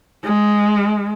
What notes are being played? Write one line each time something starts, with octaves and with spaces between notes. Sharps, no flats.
G#3